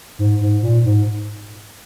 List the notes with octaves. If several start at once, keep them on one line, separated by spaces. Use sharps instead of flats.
G#2
G#2
A#2
G#2